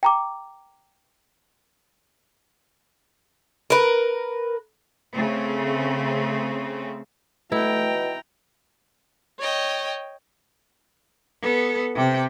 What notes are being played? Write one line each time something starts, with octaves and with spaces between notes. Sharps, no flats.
G5 A#5 D6
A#4 B4
C#3 A3 C4
B2 A3 E4 G5 A#5
C#5 D#5 G5
B3 A4
C3 G5